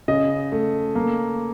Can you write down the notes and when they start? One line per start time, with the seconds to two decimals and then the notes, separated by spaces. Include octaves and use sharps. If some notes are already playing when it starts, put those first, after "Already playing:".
0.08 C#3 D#5
0.52 A3
0.95 A#3